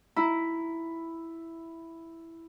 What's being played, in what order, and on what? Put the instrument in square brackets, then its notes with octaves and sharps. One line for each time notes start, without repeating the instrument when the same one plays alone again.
[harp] E4 [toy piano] A#5